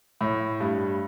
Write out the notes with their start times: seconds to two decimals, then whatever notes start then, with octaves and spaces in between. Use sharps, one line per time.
0.21 A2
0.60 G2